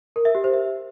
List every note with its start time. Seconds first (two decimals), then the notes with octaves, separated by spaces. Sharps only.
0.16 A#4
0.25 E5
0.35 G4
0.44 C5
0.54 E5